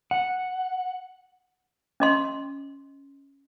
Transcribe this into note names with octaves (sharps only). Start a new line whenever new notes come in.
F#5
C#4 D#5 C6